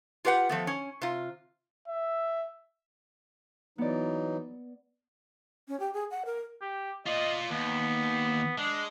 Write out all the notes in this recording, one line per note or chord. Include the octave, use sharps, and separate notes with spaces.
F4 G4 B4 F5 F#5
F3 A3 B3
C#4
C3 F4
E5
E3 F#3 B3 D#4 D5
C#4
G4
G#4
F#5
A#4
G4
F4 D5 D#5
D#2 B3
G#3 D4